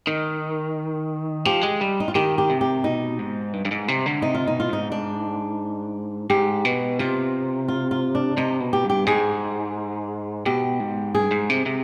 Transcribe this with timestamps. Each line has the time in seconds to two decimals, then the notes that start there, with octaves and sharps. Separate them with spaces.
0.07 D#3 D#4
1.45 F3 G4
1.63 G#3
1.81 G3
2.00 D#4
2.08 F4
2.15 D#3 G4
2.38 G4
2.50 C3
2.61 G4
2.84 B2 D#4
3.19 G#2
3.53 G2
3.65 G2
3.71 G#2
3.88 C3
4.06 D3
4.22 C3 D#4
4.34 F4
4.46 B2 D#4
4.60 F4
4.69 G#2 D#4
4.92 D4
6.30 G#2 G4
6.65 B2
6.99 C3 F4
7.68 F4
7.91 F4
8.15 D4
8.37 C3 D#4
8.60 B2
8.73 G4
8.84 G2
8.90 G4
9.06 G#2 G#4
10.46 B2 G4
10.80 G#2
11.15 G2 G#4
11.31 G#2
11.50 C3
11.66 C3